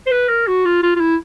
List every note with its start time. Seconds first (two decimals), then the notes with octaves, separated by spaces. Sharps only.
0.06 C5
0.11 B4
0.29 A#4
0.47 F#4
0.65 F4
0.83 F4
0.96 F4
1.00 E4